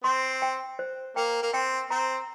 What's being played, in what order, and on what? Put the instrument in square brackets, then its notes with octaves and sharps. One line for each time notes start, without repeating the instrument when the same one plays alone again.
[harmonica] C4 [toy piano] C6
[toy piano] G5
C5
[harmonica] A#3 [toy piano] G5
[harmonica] A#3
[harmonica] C4 [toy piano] G5
[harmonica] C4 [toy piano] A#5